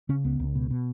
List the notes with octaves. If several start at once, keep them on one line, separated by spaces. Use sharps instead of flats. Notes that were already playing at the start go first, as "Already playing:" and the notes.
C#3 C#4
C#2 B3
C#2
B2
B2